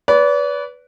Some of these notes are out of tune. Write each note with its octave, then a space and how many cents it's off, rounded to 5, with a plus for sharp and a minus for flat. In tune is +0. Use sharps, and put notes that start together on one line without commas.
B4 +0 D5 -35